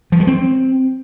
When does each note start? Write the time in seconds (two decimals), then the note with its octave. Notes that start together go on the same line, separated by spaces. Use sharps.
0.12 F3
0.20 G#3
0.27 C4